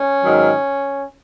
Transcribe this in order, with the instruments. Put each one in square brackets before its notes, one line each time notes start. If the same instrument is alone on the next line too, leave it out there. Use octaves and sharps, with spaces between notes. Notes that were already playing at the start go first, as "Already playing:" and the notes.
Already playing: [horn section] C#4
G#2 D#3 F#3